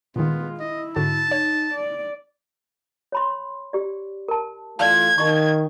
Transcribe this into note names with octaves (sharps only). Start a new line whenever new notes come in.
A#2 D#3 G#3 B3 F4
E4 D#5
G#2 D3 F#4 A5
D#4 C#5
D5
C#5 B5 C6
G4 D5
A#4 A5
E3 A3 F4 D5 F5 A5 G#6
D#3 D#4 D#5 C#6